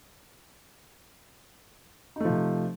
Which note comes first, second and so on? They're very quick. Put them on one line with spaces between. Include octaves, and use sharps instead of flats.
D#4 A3 F3 C3